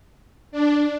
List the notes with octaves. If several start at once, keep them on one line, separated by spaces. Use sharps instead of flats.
D4